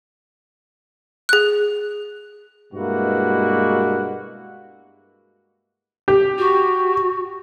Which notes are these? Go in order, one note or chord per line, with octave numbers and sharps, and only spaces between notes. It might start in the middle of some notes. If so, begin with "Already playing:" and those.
G#4 F#6
G2 B2 G#3 A#3 E4 F#4
G4
F#4